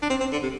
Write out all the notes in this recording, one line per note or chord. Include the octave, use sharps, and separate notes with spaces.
D4
C4
C4
D3
C3